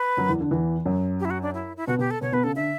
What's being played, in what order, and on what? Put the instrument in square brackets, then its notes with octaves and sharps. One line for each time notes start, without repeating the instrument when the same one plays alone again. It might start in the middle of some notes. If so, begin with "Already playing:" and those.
Already playing: [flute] B4
[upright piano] F#2 F#3
E2 E3
D3
E2 E3
F#2 F#3
[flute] G4
E4
F#4
D4
E4
E4
[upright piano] B2 B3 [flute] F#4
[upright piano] B2 B3 [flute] G4
[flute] A4
[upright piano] B2 B3 [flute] C#5
[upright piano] B2 B3 [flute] B4
[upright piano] C#3 [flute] A4
[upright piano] D3 [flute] E5